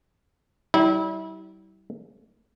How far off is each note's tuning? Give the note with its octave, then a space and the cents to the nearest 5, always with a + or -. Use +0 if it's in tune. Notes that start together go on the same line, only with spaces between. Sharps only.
G3 -35 E4 -30